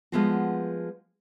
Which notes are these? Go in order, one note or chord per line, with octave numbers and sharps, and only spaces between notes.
F3 G#3 A3 B3 F4 F#4